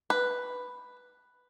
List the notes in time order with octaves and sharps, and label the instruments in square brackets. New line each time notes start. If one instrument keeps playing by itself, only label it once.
[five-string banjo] B4